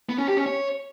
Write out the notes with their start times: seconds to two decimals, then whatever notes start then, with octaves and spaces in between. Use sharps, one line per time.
0.09 B3
0.18 C#4
0.28 G4
0.37 C#4
0.46 C#5